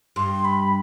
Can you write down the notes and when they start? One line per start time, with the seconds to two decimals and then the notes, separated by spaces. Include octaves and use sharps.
0.16 G2 C6
0.45 B5